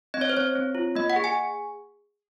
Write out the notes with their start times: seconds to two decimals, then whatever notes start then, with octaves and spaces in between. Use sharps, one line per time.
0.14 C4 D#5
0.21 C#5
0.29 C5
0.34 C4 C#5
0.55 C4
0.75 F4
0.95 A#3 D#5
1.10 F#5
1.16 G#4
1.24 G#5